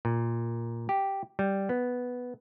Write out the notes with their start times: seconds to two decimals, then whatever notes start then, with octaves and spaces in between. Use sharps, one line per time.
0.05 A#2
0.89 G4
1.39 G3
1.69 B3